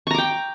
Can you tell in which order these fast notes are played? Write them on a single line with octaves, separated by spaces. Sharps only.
C#6 A#5 D6 G5